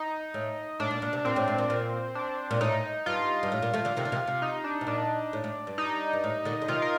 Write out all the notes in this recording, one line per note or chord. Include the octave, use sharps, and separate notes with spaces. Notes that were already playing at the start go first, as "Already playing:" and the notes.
Already playing: D#4
A2
A2 D4
A#2
A#2
C3
A#2 C4
A2
A2
A#2
A#2
D4
A#2
A2 D#4
G2 F4
G2
A2
A#2
F3 A3
D3 F3
C3 D#3
D3
C3 D#3
C3
D#4
D4
C3
A#2 D4
A2
A2
G2
D#4
G2
A2
A#2 D3
D3
C3 D#3 F4
A#4